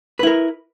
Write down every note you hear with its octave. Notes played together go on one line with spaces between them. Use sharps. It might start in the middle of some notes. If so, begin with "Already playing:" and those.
E4 A#4 B4